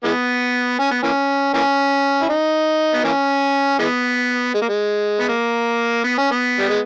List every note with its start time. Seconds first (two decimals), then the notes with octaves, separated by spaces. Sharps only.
0.04 E3 G#3 B3
0.79 C#4
0.91 B3
1.03 E3 A#3 C#4
1.54 E3 A#3 C#4
2.22 E4
2.29 D#4
2.94 B3
3.04 E3 A#3 C#4
3.79 E3 G#3 B3
4.54 G#3
4.61 A#3
4.69 G#3
5.20 B3
5.29 A#3
6.04 B3
6.18 C#4
6.32 B3
6.59 G3
6.69 G#3